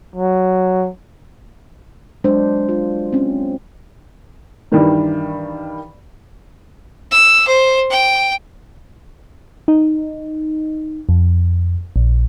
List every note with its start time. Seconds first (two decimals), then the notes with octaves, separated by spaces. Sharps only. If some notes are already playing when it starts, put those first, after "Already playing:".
0.15 F#3
2.24 F#3 G#3 D4 C5
2.69 F4
3.13 C4 C#4
4.72 G2 D#3 E3 G3
7.12 E6
7.47 C5
7.91 G5
9.68 D#4
11.09 F2
11.96 A#1